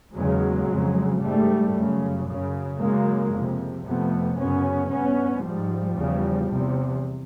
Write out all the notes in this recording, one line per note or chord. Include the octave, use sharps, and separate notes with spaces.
E2 C#3 F#3 G#3
F2 C#3
G#2 G3 A3
F#2 C#3
F#2 C#3
F#2 C#3 G#3 A#3
F2 C3
F2 C3 A3 B3
F#2 C#3 B3 C#4
G2 B3 C#4
G#2 F3 G3
E2 C#3
E2 C3